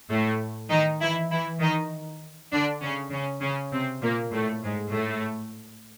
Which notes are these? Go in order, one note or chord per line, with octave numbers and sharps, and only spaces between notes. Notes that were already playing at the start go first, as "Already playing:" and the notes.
A2 A3
D#3 D#4
E3 E4
E3 E4
D#3 D#4
D3 D4
C#3 C#4
C#3 C#4
C#3 C#4
C3 C4
A#2 A#3
A2 A3
G#2 G#3
A2 A3